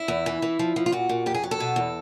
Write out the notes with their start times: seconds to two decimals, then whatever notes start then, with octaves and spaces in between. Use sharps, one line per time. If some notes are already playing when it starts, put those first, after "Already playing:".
Already playing: E4
0.08 E2
0.26 E3
0.42 E3
0.59 F3
0.76 F3
0.86 F4
0.92 A#2 F#4
1.09 A#2
1.26 F2 G4
1.35 G#4
1.44 F#3
1.51 A4
1.60 B2
1.76 E2